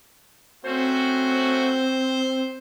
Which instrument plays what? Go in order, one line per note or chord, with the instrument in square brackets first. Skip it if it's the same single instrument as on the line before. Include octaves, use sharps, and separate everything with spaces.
[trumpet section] A3 C#4 F#4 [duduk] C4 [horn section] C5